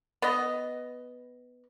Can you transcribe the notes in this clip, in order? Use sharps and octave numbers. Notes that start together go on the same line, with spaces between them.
B3 D#5